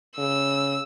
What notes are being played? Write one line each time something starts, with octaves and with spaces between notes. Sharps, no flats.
C#3 E6